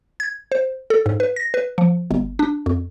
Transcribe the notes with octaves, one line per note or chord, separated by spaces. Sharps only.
G#6
C5
A4
G#2
B4
A#6
B4
F3
G1
D4
F2